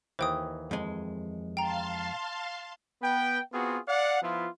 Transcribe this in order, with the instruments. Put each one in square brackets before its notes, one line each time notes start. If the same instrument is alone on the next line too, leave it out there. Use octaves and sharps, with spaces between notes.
[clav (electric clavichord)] D#2 E3 [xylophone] C5 G5 D#6
[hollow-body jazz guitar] F2 G#3
[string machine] F5 A5 C6 [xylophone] G5 A#5
[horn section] B3 B4 G5
B3 C4 F4 F#4 G#4
D5 F5 F#5
F3 B3 E4 F4